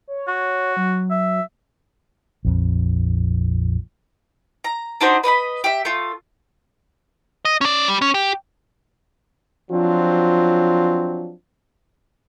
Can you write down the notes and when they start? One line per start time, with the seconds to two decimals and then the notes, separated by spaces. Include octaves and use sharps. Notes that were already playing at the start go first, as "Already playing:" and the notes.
0.08 C#5
0.28 F#4
0.77 F#3
1.10 E5
2.45 A#1 F2
4.64 A#5
5.01 D4 D#4 F#4 C5
5.24 B4 D#5 G5 B5
5.64 G4 E5
5.85 A3 F4
7.45 D#5
7.61 C#4 D5
7.88 G3
8.02 C#4
8.14 G4
9.71 F3 F#3 C4 D4 F4